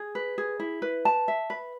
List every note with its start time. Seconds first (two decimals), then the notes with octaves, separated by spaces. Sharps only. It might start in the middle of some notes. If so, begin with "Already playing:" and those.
Already playing: G#4
0.15 B4
0.38 G#4
0.60 E4
0.82 B4
1.05 A5
1.28 E5
1.50 B4